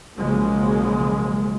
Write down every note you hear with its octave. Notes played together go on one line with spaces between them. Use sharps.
B1 C#3 F3 F#3 G#3 A#3